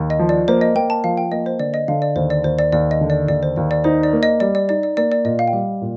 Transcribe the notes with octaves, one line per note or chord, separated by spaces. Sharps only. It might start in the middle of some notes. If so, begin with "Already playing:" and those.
Already playing: D#2
D#5
F3
D5
A#3 C5
D#5
A#3 G5
A5
F3 F5
G5
A#3 D#5
C5
D3 D5
D#5
D3 F5
D5
D#2 C5
D5
D#2 C5
D5
D#2 D5
D#5
D3
D5
D#2 D5
C5
D#2 D5
D5
D#4 C5
D5
A#3
D#5
G3 D5
D5
D#4 D5
D5
A#3 D5
D5
A#2 D#5
F5
G5
G3 F5
A#2